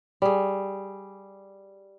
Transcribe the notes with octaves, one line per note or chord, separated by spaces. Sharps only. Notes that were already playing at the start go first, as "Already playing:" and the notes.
G3 G#4